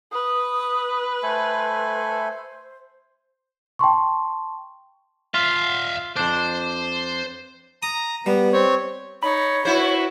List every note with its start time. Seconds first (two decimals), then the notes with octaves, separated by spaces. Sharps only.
0.12 B4 D#6
1.23 A3 A4 C5 G#5
3.79 G5 A5 C6 C#6
5.34 F4 E5 F5
6.17 F2 D4 C5
7.83 A#5 D#6
8.26 G3 B3
8.53 C4 C#5
9.23 D#4 C#5 B5
9.65 E4 F#4 B4 C5